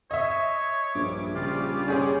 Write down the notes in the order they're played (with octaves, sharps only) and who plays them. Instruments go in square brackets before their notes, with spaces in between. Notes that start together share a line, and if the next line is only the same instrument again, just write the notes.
[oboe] C#5 [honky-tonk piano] D#5 E5
[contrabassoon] A#1 [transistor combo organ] G2 D6
[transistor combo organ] C#3 G3 D5 [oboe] F4
[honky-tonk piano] C#4 G#4 C#5 [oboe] C5